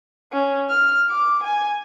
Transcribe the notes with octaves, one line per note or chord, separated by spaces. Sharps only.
C#4
F6
D6
G#5